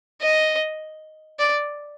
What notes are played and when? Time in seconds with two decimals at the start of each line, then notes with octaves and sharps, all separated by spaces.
0.22 D#5
1.39 D5